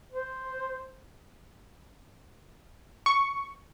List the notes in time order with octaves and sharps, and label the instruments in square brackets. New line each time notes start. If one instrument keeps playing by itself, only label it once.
[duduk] C5
[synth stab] C#6